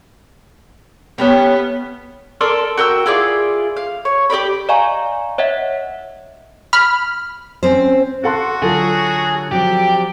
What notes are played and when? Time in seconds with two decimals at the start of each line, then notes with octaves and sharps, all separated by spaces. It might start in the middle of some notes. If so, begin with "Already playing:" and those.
1.18 G3 A3 B3 C#4
2.41 A4 A#4 D5 C6
2.77 F#4 A#4 G5 E6
3.06 E4 F4 G#4 D5
3.76 F5
4.05 C#5
4.30 G4 A#4 D5 B5
4.69 D5 D#5 F5 G#5 A#5 C#6
5.38 C#5 D#5 E5 F#5
6.73 B5 F6
7.63 C4 C#4 C5
8.24 F#4 A4 F#5 C6
8.62 D3 F#3 F4 G#4 A4
9.51 F3 F#3 C4 G4 D5